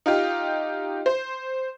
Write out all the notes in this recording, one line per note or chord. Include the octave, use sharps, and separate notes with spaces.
D#4 F4 G4
C5